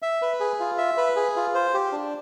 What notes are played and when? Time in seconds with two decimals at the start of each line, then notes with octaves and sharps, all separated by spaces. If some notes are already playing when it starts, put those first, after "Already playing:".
0.02 E5
0.22 B4
0.40 G#4
0.60 F4
0.78 E5
0.97 B4
1.16 G#4
1.36 F4
1.55 C5
1.74 G4
1.92 D4